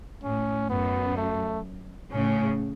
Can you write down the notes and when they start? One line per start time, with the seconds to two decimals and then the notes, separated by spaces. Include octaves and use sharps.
0.23 A2 C#4
0.70 F#2 B3
1.17 A3
2.11 A2 C#3 C#4